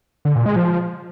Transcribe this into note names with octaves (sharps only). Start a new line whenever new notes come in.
D3
A#2
G#3
F3